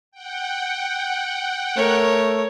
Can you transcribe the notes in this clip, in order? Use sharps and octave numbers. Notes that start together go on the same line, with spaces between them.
F#5 G5
A3 A#4 C#5